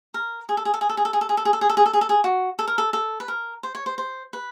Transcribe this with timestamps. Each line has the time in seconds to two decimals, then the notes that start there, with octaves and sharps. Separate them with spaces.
0.14 A#4
0.49 G#4
0.57 A4
0.65 G#4
0.74 A4
0.81 G#4
0.89 A4
0.97 G#4
1.05 A4
1.13 G#4
1.21 A4
1.29 G#4
1.37 A4
1.45 G#4
1.53 A4
1.61 G#4
1.69 A4
1.77 G#4
1.86 A4
1.93 G#4
2.01 A4
2.09 G#4
2.24 F#4
2.59 A4
2.68 A#4
2.78 A4
2.93 A4
3.20 B4
3.28 A#4
3.63 C5
3.75 C#5
3.86 C5
3.98 C5
4.33 B4